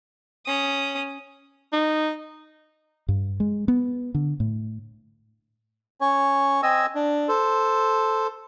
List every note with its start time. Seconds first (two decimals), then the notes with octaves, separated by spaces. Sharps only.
0.46 C#4 D#6
1.73 D#4
3.08 G2
3.40 G#3
3.68 B3
4.14 D3
4.40 A2
6.01 C#4 C#5
6.63 C4 D#5 G#5 E6
6.95 D4
7.28 A4 C5